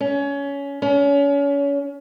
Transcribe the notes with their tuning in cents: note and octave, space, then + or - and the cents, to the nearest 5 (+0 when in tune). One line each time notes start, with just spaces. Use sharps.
C#4 +20
C#4 +30